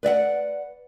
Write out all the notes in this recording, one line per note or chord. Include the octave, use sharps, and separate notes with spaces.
B4 D5 E5 F#5